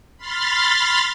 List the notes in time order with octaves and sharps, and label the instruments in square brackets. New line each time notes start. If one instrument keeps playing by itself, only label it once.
[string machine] B5 C6 F6 A6